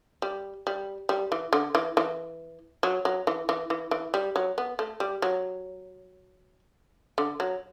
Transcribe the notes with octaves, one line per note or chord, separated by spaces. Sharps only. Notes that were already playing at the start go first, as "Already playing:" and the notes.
G3
G3
G3
E3
D3
E3
E3
F#3
F#3
E3
E3
E3
E3
G3
F#3
B3
A3
G3
F#3
D3
F#3